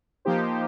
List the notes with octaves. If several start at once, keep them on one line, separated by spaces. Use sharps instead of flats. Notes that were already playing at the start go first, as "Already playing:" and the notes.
F3 A#3 D#4 G4 C5